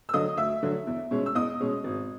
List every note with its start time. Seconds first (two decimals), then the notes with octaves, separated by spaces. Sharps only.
0.09 E6
0.13 D3 F#3 D#5 D#6
0.37 D2 E5 E6
0.62 D3 F#3
0.87 E2
1.11 B2 G#3 C#4
1.26 E6
1.35 E2 D#5 D#6
1.60 B2 G#3 C#4
1.84 G#1